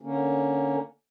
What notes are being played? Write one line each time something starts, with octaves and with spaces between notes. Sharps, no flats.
D3 A#3 C#4